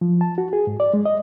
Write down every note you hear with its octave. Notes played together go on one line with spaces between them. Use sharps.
F3
A5
F#4
G#4
G#2
D5
G#3
D#5